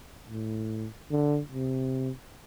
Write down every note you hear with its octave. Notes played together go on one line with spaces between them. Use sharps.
A2
D3
C3